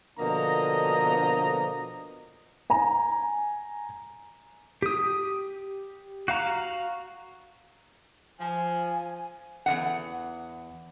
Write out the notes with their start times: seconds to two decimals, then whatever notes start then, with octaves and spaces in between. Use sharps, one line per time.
0.19 B2 D3 F3 A#3 D#5 A#5
2.70 G#5 A#5
4.82 G4 D#6
6.28 F#4 F5 A#5
8.40 F3 G#5
9.66 E2 G2 F#5